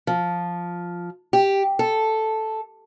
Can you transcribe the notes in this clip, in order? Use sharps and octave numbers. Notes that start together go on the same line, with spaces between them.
F3
G4
A4